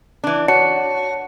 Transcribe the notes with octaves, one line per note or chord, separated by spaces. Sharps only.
E3 D4
F#4 C#5 A5 C#7